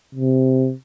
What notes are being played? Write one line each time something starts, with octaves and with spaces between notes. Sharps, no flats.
C3